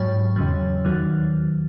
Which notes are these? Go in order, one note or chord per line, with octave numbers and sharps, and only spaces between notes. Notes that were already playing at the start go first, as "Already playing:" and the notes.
Already playing: G#2 F#3 C#5
E2 C#3 F#3
D#2 D#3 F#3